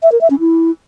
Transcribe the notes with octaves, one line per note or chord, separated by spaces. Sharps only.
E5
A#4
E5
C#4
E4